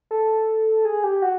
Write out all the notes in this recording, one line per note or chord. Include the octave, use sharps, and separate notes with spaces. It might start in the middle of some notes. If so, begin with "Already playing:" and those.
A4
G#4
G4
F#4